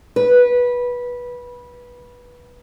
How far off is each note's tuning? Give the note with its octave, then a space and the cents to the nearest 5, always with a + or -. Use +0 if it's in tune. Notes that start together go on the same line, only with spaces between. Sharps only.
B4 -15